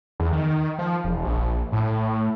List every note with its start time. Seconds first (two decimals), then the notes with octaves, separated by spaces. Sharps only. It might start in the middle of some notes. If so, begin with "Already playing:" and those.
0.20 E2
0.33 D#3
0.79 F3
1.04 E1
1.25 A#1
1.72 A2